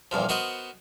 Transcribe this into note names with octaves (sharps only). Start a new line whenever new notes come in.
A#1 E2 G2 F3
B3 F#4 A#4 C5 D#5 F#5